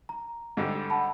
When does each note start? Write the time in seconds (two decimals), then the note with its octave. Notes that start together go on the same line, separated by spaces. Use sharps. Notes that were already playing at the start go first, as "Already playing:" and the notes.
0.09 A#5
0.57 G#2 D3 G3
0.90 F#5 A5 B5